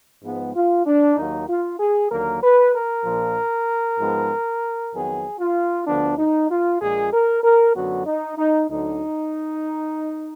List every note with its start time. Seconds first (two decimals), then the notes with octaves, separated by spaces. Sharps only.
0.23 G#2 F3 G#3 B3
0.55 F4
0.86 D4
1.16 D#2 D#3 F#3 A#3 D#4
1.48 F4
1.79 G#4
2.10 D#2 D3 F#3 A#3 A#4
2.42 B4
2.74 A#4
3.04 A#1 A#2 F3
3.99 G#2 F3 G#3 B3
4.93 F2 D#3 F#3 B3 G#4
5.40 F4
5.86 D2 D3 F3 B3 D4
6.18 D#4
6.50 F4
6.80 A#1 A#2 G#3 G#4
7.12 A#4
7.43 A#4
7.75 F#2 D3 F#3 B3 F#4
8.06 D#4
8.37 D#4
8.69 D2 D3 F#3 D#4